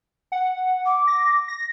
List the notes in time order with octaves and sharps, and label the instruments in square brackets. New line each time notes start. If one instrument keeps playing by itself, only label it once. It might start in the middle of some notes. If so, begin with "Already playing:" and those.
[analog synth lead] F#5
[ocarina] D6
[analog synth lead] A#6
A#6